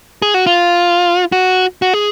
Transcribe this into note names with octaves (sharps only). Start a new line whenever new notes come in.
G#4
F#4
F4
F#4
F#4
G#4